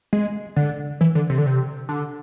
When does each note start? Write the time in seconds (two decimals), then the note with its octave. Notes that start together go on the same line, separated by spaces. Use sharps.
0.13 G#3
0.56 D3
1.01 E3
1.15 D3
1.30 C3
1.38 D3
1.46 C3
1.89 D3